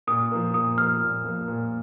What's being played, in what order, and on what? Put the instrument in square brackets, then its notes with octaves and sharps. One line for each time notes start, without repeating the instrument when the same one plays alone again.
[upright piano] A#2 [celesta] D#6
[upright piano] F3 A#3
[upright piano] A#2 [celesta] D#6
[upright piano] F3 A#3 [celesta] F6
[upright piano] A#2
F3 A#3
A#2